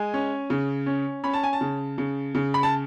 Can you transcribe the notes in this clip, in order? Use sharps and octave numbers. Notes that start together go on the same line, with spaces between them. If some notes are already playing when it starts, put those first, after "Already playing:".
Already playing: G#3 G#5
C#4
C#3
C#4
C#4 B5
A5
G#5
A5
C#3
C#3
C#3
B5
A5